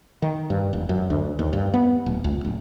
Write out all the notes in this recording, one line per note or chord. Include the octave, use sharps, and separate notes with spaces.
D#3
G2
E1
F#2
D2
D#2
G2
B3
D1
C#2
D1